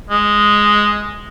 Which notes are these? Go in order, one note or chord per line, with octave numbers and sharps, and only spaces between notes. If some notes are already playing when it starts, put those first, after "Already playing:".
G#3